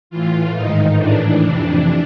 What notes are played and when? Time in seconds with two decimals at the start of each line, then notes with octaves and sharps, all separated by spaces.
0.10 A2 E3 F4
0.54 G#2 D#3 D#4
0.98 A2 E3 D4
1.42 F2 C3 E3 D4